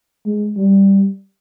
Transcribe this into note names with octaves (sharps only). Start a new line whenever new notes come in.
G#3
G3